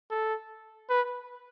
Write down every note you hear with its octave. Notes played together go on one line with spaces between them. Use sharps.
A4
B4